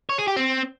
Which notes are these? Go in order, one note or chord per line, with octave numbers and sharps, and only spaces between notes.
C#5
G#4
G4
C4